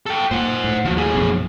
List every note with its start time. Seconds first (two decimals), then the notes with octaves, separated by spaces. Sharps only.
0.06 A4 G5
0.31 A#2 C5 F#5
0.64 A2
0.85 D#2 F3 F#4
0.96 A2 G#4
1.15 A#1 F#2 B2